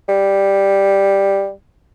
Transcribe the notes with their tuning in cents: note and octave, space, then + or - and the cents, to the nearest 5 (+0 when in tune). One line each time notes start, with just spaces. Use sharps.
G3 +5